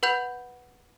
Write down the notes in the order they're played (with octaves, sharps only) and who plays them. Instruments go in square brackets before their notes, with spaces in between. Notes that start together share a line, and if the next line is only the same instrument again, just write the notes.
[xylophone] B4 F#5 B5 G6 F7